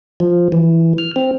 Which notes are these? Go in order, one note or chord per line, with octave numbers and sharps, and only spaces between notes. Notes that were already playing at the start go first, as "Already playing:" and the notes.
F3
E3
F6
C4